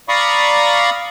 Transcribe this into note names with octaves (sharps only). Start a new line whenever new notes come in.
D5 F5 A#5 B5 C#6 D#6